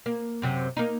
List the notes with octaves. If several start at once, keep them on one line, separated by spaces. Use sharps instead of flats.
A#3
F#2 C3 F#3
A#3 D#4